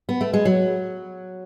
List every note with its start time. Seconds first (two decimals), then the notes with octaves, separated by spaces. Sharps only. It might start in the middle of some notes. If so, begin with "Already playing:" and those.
0.09 B3
0.21 A3
0.33 G#3
0.45 F#3